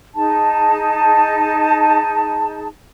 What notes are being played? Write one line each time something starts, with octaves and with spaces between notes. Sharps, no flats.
D#4 G#4 A5